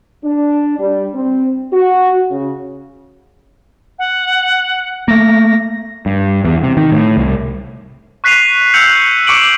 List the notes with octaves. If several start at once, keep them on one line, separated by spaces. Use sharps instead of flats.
D4
G3
C4
F#4
C#3
F#5
A3 A#3 A#6
G2
E2
C3
D#3
A2
C2
C#6 F#6 B6 C7 D#7 F7
E6 F#6 G6 C#7 F7 F#7
C#6 D6 C#7 D7 F#7